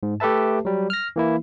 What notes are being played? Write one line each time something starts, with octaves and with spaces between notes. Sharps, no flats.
G#2
A3 G4 A4 B4 E5 A5
F#3 G3
F6 A#6
E3 A#3 E4